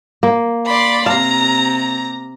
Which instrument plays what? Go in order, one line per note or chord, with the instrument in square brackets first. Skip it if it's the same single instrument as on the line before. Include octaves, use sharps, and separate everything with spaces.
[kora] A#3
[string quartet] D5 B5 C6
[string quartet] C3 A#5 [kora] F5